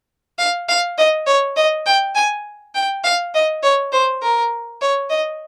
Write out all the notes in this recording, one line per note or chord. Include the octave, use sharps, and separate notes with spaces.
F5
F5
D#5
C#5
D#5
G5
G#5
G5
F5
D#5
C#5
C5
A#4
C#5
D#5